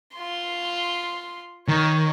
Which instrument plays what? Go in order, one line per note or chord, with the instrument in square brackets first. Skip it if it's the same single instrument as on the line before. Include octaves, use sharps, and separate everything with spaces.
[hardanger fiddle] F4 C6
[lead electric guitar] D#3 [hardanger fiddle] C#5